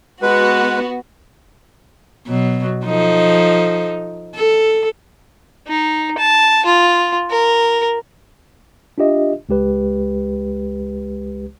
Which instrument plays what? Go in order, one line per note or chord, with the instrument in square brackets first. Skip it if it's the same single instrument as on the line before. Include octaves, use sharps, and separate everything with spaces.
[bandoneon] G#3 B4 [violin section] B3 F#4
[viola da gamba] B2 F#3
F3 D#4 A4
A4
[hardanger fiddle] D#4
A5
F4
A#4
[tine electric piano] D4 F4 G4 D#5 E5
C#2 G#3 G4 B4